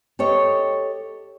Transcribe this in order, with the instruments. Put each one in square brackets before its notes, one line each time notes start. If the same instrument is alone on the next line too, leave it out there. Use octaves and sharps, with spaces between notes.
[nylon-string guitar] G4 A4 C#5 D#5